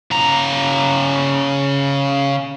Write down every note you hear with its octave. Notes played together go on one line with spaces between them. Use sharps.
C#3 A#5